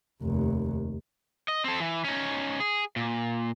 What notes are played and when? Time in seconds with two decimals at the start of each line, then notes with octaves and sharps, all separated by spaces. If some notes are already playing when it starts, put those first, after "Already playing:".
0.22 F1 D#2
1.48 D#5
1.64 C4 A4
1.80 E3
2.05 C#4 D#4
2.60 G#4
2.96 A#2